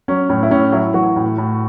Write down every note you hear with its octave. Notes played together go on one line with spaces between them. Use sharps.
F#3 C#4
A2 C#4
E4
A2 C#4
F#3 E4
E3 F#4
A2
A2